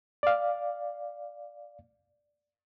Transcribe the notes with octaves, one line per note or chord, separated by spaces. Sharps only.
D5 F5